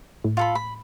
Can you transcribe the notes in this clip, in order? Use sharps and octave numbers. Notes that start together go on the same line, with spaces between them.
A2
F4 A4 B5
B5